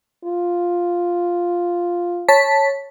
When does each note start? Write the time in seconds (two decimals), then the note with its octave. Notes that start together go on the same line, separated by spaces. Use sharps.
0.25 F4
2.28 C#5 A5 B6